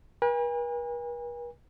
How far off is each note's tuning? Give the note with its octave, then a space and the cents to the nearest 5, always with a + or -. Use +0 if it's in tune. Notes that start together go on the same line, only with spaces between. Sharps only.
B4 -45 G#5 -40